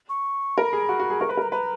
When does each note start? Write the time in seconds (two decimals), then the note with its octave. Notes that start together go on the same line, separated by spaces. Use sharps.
0.09 C#6
0.58 A#4 B5
0.73 G#4
0.89 F#4
1.00 F#4
1.10 G#4
1.20 A#4 C#6
1.29 B4 B5
1.37 A#4 A#5
1.52 B4 A#5